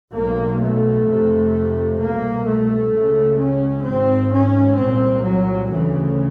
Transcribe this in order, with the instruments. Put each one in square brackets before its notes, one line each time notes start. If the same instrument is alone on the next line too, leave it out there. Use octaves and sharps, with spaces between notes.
[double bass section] B1 B2 A#3
A3
F1 F2 C3
C2 B2 A#3
A3
C#2 C#3
C#4
G#1 G#2 C4
C#4
C2 A#2 C4
F#3
D2 C#3 E3